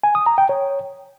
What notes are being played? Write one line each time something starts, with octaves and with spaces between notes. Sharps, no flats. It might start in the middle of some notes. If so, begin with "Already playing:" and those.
G#5
D#6
A#5
G5
C#5